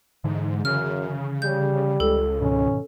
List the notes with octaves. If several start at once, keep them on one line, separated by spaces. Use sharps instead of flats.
G#2 D3 E3
F#2 C#3 F6
G3 G6
C#2 A4
G#2 B2 D#3 C#4